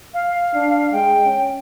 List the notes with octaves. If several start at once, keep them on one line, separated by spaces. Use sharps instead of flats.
F5
D4
G#3 G5
C#4